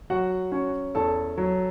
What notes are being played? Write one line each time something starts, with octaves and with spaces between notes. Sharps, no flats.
F#3 F#4 F#5
C#4
E2 A4 A5
F#3